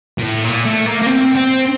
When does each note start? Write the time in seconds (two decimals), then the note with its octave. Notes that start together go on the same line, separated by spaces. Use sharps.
0.18 A#2
0.22 A2
0.44 A#2
0.65 A3
0.86 A#3
1.02 A#3
1.07 C4
1.36 C4